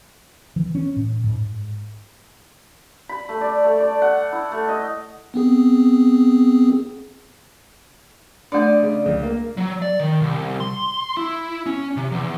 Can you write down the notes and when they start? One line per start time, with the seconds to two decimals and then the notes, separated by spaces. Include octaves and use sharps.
0.56 E3
0.75 C#4
0.96 A2
1.24 G#2
3.09 B5
3.29 A3
3.41 D5
3.64 A3
3.80 D5
4.02 F#5
4.33 E4
4.52 A3
4.69 D#5
5.34 B3 C4 G#4
8.52 A3 D4 D5 D#5
8.82 C#3
9.05 C#2
9.23 A#3
9.57 F#3
9.82 D5
10.00 D#3
10.22 C2
10.60 C6
11.17 E4
11.66 C#4
11.97 C3
12.12 E2